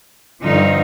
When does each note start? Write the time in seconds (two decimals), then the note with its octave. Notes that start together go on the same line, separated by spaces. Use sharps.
0.41 G2 D3 F3 D#4